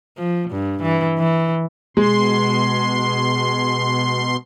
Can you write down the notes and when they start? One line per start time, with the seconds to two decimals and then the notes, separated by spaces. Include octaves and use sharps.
0.18 F3
0.50 G2
0.82 E3
1.18 E3
1.97 B2 G#3 C6